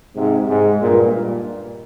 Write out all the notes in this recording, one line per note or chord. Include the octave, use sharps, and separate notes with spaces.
G#2 C3
G#2
G2 A#2